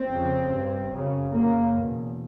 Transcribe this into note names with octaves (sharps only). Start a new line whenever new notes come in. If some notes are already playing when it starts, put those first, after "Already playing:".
Already playing: C4
F2 C#3
G2
F#2 C#3
F#2 C#3 A#3
E2 B2